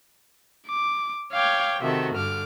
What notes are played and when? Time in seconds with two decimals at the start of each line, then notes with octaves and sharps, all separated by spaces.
0.68 D6
1.32 C#5 F5 G5 D6 G#6
1.81 C3 D#3 F#4 A4 E5
2.15 G2 D3 D6 F6